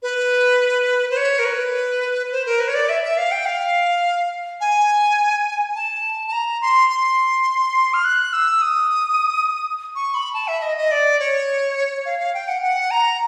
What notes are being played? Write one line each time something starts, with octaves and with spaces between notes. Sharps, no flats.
B4
C5
C#5
A#4
B4
C5
A#4
B4
C#5
D5
E5
E5
F5
G5
F5
G#5
A5
A5
A#5
C6
C6
F6
F#6
E6
D#6
C#6
B5
A5
E5
D#5
D#5
D5
C#5
F5
F5
G5
F#5
F#5
A#5